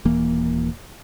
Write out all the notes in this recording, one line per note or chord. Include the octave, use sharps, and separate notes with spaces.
D#1 E3 A#3